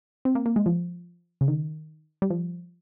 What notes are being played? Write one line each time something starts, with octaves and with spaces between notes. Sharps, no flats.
C4
A#3
A#3
G#3
F3
C#3
D#3
G3
F3